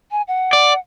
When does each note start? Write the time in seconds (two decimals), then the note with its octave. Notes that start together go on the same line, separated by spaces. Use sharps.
0.11 G#5
0.28 F#5
0.53 D5